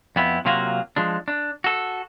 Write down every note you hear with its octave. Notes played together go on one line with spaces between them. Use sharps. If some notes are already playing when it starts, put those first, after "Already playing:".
F2 B3 E4
C3 F#3 A#3 F4 F#4
F3 G#3 D4
D4
F#4 A4